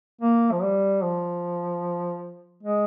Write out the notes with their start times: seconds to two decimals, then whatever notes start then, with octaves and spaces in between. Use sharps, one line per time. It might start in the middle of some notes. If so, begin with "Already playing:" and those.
0.21 A#3
0.52 F3
0.62 G3
1.02 F3
2.63 G#3